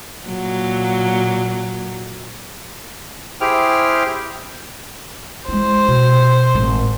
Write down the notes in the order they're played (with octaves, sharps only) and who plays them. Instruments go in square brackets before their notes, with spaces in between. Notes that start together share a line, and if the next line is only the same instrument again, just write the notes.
[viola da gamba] A#2 F#3
[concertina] E4 G4 G#4 C5 G5 F6
[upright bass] G#3 E4 [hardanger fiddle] C5
[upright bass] B2
G#1 A2